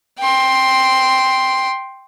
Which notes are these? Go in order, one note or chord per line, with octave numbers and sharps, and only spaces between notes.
G5 C6